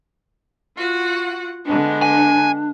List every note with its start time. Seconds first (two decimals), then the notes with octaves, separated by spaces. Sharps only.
0.75 F4 F#4 F#5
1.65 D3 G#3 B3 D4
2.02 G#5